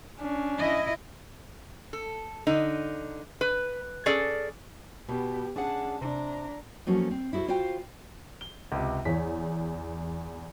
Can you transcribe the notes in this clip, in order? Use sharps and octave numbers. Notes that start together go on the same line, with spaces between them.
C#4 D4
E4 D#5
A4
D3 D#4
B4
C#4 G#4 A4 D5
B2 B3 G4
C#4 D4 G#4 F#5 A5
C3 D4 A#5
F3 F#3 A3 A#3 C#4 F#4
C4
E4 F#4 G#4 A4 C5
F4 F#4 C5 F5 G5
G7
C#2 C3
E2 C#5 B6